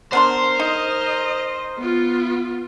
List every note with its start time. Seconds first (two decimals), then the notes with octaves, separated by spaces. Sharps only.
0.13 B3 D4 A#4 C5 C6
0.60 D#4 D#5
1.79 B3 F4